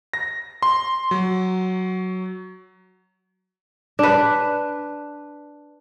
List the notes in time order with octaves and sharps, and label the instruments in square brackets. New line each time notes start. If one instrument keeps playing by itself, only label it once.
[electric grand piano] A#6
C6
F#3
[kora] D4 B4